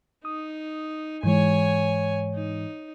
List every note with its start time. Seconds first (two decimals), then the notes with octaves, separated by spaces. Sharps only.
0.25 D#4 D#6
1.24 G#2 E3 G#3 C#5 G#5
2.35 D#4